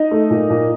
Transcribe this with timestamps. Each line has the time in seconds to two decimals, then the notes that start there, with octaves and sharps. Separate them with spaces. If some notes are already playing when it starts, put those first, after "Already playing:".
Already playing: D#4 D#5
0.11 A3
0.30 A#2
0.50 A#2